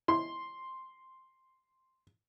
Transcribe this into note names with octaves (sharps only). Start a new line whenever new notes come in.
E4 C6